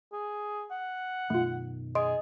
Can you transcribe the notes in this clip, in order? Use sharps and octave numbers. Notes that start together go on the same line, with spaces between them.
G#4
F#5
F#2 B2 D#3 A3 F4
G#4 D#5 C6 D7